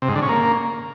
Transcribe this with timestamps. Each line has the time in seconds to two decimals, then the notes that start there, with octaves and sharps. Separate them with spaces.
0.02 C3
0.09 G#2
0.15 D3
0.22 C#4
0.29 A#3